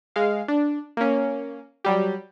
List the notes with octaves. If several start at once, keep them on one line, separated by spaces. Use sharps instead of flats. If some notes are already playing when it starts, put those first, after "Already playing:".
G#3 F5
D4
A#3 C#4
F#3 G3 G4